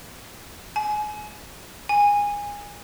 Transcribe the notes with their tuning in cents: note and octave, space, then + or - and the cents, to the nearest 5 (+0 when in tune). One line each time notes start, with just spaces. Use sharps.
G#5 +25
G#5 -20